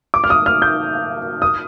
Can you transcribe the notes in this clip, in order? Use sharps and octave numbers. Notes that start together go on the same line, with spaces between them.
D6
F6
D#6
F6
G6
D#6